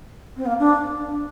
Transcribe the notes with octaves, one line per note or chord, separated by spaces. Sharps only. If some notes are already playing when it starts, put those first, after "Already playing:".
C4
A#3
D4